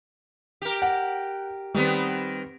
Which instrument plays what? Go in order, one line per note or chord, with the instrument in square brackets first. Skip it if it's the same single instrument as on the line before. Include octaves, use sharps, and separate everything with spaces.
[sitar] G4 A#4
[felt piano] F#5
[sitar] D#3 B3 [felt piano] G3 C4